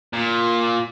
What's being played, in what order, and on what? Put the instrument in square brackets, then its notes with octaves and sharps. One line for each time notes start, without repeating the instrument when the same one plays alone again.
[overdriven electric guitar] A#2